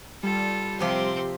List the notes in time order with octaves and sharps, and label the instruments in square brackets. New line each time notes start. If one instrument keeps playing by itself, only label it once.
[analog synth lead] G3 [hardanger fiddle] F4 A4
[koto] C3 F3 G4 [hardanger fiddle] C4 C6